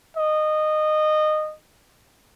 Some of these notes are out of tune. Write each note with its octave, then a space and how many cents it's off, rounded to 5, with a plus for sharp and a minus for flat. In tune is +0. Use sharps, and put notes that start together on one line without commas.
D#5 -20